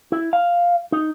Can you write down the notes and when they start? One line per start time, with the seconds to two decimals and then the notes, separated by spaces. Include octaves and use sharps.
0.12 E4
0.33 F5
0.92 D#4